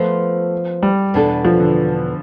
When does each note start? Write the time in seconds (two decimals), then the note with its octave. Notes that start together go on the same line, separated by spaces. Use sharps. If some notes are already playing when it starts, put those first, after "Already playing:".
Already playing: F3 A3 B3 F4 C5
0.83 G3
1.14 E2 B2 B3 D4 A4
1.45 F3
1.60 D3